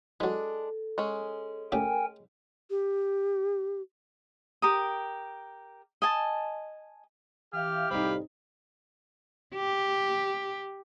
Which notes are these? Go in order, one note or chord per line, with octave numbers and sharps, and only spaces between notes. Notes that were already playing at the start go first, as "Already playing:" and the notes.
E3 F#3 G#3 D4 A4
G#3 C#4
A2 C#3 G4 A#4 G5 G#5
G4
G4 A#4 D#6
D#5 G#5 A5
E3 G4 E5 F5 F6
C2 A2 G3 C4 D#4 F5 B5
G4